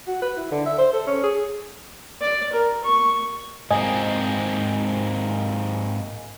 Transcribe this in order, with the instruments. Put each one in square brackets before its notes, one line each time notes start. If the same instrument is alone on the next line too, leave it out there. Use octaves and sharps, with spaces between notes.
[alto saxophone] F#4
B4
E4
D3
E5
C5
A4
C#4
G#4
[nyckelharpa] D5
A#4
C#6
[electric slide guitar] G#2 A#3 C4 [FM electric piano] D#5 G#5